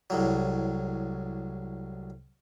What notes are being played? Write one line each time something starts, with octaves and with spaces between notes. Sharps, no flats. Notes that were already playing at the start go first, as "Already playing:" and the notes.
C2 A2 F#3